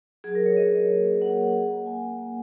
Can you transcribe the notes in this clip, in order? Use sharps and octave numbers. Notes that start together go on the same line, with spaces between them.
F#3 G#4
A#4
F#3
C#5
F#4 D#5
F#4
A#3
C#4
A#3 F#5
C#4
C#4
A#3
A#3 G#5
A#3
A#3